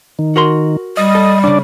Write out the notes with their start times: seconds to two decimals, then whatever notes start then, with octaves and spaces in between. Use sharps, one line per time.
0.19 D#3
0.36 F#4 A#4 C6
0.97 G3 D#5
1.15 A4
1.44 D#2 C#3 D4 D5